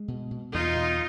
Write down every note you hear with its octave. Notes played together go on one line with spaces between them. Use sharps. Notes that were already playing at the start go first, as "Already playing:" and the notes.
Already playing: G#3
B2
B2
E2 D#4 F4
B2